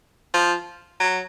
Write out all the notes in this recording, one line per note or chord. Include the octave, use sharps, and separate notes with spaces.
F3
F#3